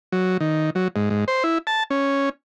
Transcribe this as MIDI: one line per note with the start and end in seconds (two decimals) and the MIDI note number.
0.12 0.37 54
0.40 0.70 51
0.75 0.88 54
0.96 1.09 44
1.10 1.24 44
1.28 1.43 72
1.44 1.58 64
1.67 1.83 81
1.90 2.29 61